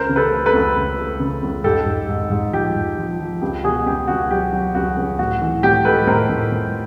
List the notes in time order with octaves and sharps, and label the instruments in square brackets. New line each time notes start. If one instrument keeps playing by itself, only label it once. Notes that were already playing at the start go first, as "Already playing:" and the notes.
Already playing: [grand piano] C#2 A#4 C5
C#3
A4 B4
A3
A4 B4
C#2
C#2
A3
C#3
C#2
G#2 G4 A4
G#2
G#2
G#2
F3 G4
G#2
F3
F3
C#2 G4
B2 F#4 G#4
C#2 G4
C#2 F#4
F#3 G4
F#3
C#2 F#4
C#2
A2 F#4
E3
A2 G4
G#3 A4 B4
A2 A#4 C5
A2
A2